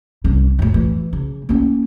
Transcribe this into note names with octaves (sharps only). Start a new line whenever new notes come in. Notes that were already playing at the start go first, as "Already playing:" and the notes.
C2 C#3
F2 A2
E3
C#3
A#3 C#4